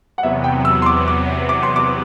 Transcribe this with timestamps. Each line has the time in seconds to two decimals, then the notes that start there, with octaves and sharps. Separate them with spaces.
0.18 F#5
0.23 E2 C3 F#3 B3 E5
0.44 G5
0.65 E6
0.82 C6
0.86 D6
1.08 D6
1.49 D6
1.63 C6
1.76 D6